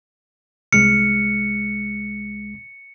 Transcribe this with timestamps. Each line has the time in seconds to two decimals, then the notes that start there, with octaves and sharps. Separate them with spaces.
0.72 C2 G#3 F6 C#7